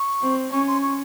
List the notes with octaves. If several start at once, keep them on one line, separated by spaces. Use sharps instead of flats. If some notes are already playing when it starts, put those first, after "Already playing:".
Already playing: C#6
C4
C#4 C#6
C6
C#6